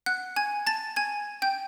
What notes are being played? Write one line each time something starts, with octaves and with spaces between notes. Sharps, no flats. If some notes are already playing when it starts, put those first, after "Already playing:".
F#5 F#6
G#5 G#6
A5 A6
G#5 G#6
G5 G6